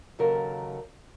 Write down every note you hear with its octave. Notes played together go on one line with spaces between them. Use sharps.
D#2 C#3 F#3 A4 A#4